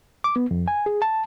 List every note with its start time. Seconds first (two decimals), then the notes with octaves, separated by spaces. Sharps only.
0.24 D6
0.36 B3
0.51 F2
0.68 G#5
0.86 G#4
1.02 A5